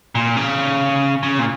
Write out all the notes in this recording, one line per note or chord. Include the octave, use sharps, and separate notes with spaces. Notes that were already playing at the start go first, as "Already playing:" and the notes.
A#2
C#3
C#3
A#2